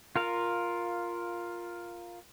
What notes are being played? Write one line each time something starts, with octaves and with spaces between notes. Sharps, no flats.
F4 A#4 F5